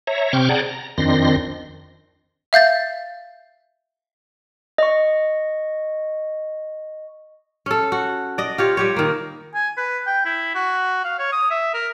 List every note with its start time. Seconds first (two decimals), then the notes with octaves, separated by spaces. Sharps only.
0.07 C#5 E5 A#5
0.33 C3 C4 G5 C#6 D6 F6
0.49 G#4 D5 F#5 G5 A5 A#5
0.66 A#5
0.98 F2 D#3 C4 D4 C6 A#6
2.53 E5 F5 G6 A6
4.78 D#5 C#6
7.66 C#4 A4
7.92 F#4
8.38 D5 D#5
8.58 F4 G4 C#5
8.77 G3 G4 C#5
8.96 D#3 A#3
9.55 G#5
9.77 B4
10.07 G5
10.26 E4
10.55 F#4
11.05 F5
11.19 C#5
11.32 D#6
11.51 E5
11.74 A#4